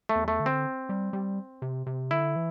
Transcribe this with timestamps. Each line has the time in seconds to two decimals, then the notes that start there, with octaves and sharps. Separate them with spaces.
0.09 A3
0.15 E2
0.28 A3
0.40 D3
0.46 C4
0.89 G3
1.13 G3
1.62 C3
1.87 C3
2.11 D3 E4
2.36 E3